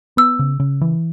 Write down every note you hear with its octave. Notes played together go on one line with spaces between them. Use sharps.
B3 E6
C#3
C#3
E3